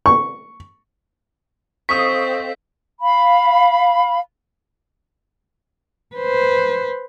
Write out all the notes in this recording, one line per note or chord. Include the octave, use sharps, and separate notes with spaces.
C#6
C4 A4 C5 D#5 F5 C#6 D#6 B6
F5 B5
B4 C5